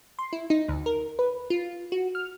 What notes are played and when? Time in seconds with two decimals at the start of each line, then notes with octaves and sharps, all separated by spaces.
0.19 C6
0.33 E4
0.50 D#4
0.68 D2
0.86 A#4
1.19 B4
1.50 F4
1.92 F#4
2.15 F6